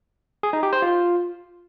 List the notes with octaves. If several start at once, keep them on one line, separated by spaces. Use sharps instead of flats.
G#4
D#4
G4
C5
F4